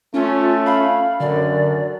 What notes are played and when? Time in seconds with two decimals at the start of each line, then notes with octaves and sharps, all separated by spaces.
0.14 A3 C#4 F4
0.66 F5 B5
1.20 F#2 D3 A#4 D5